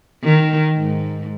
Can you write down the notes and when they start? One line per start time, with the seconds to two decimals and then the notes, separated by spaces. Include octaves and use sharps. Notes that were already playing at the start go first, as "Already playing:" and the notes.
0.24 D#3
0.78 G#2